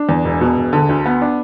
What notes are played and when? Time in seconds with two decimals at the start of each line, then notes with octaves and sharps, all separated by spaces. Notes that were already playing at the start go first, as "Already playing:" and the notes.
Already playing: D4
0.09 E2
0.25 E1
0.41 B2
0.57 E1
0.73 D3
0.89 D2
1.06 B3
1.22 D4